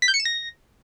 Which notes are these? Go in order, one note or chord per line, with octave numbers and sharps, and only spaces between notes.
B6
G6
C#7
E7
A#6